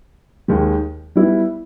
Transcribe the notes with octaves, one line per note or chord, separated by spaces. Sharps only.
D#2 D#3 G#3
G3 B3 E4